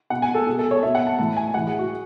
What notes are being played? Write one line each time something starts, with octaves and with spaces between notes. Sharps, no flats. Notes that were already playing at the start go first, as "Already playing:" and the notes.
B2 F#5
G#5
A4
B2 G#4
A4
C#5
B2 E5
F#5
A5
A2 E3 A5
G#5
A2 E3 F#5
G#4
F#4